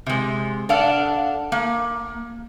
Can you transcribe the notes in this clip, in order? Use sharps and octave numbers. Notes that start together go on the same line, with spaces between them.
C3 G#3
D4 A4 F5 F#5
A#3